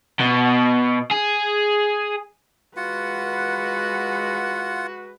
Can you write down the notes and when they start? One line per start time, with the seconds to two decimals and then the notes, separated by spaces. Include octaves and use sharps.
0.20 B2
1.11 G#4
2.77 G#3 F4 F#4 B4 F#5